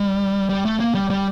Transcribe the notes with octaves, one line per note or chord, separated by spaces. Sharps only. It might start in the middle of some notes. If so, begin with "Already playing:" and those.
Already playing: G3
G3
A3
A#3
G3
G3